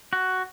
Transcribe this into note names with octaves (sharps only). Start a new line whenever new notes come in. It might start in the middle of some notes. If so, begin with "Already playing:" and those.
F#4